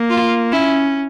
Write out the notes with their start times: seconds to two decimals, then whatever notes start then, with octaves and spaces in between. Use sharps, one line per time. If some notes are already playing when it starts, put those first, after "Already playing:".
Already playing: A#3
0.10 F4
0.52 C#4 E4